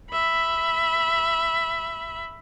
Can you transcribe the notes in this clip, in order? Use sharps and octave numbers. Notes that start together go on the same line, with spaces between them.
E5 B5